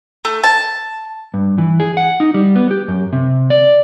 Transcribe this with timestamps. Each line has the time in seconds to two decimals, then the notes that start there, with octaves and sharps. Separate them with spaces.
0.25 A3
0.43 A5
1.34 G2
1.58 E3
1.80 G#4
1.97 F#5
2.20 D#4
2.34 G3
2.55 B3
2.71 G4
2.88 F#2
3.13 C3
3.50 D5